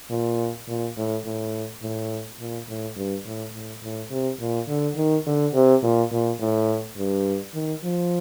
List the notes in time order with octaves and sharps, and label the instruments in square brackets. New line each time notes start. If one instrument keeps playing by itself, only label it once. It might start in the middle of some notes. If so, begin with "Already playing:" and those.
[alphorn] A#2
A#2
A2
A2
A2
A#2
A2
G2
A2
A2
A2
C3
A#2
D3
D#3
D3
C3
A#2
A#2
A2
G2
D#3
F3